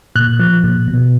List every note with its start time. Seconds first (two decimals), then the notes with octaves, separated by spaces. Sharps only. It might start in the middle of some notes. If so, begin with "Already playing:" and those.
0.16 A#2 F#6
0.40 F3
0.64 A#2
0.88 B2